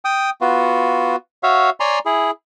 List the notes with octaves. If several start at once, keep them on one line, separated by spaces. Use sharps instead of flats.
G5 D#6
B3 F4 F#4
F#4 C#5 E5 F5
C#5 D5 G#5 A#5 C6
E4 G#4